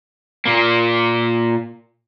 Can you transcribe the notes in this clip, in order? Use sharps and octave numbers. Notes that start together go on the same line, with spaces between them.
A#2 A#3